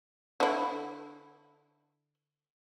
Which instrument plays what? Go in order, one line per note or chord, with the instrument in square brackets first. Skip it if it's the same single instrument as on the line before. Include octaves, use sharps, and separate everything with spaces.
[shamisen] D3 E4